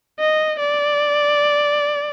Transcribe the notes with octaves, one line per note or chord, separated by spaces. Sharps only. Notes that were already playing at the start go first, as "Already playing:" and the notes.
D#5
D5